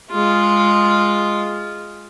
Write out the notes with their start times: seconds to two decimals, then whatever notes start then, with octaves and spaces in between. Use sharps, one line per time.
0.11 G#3 F4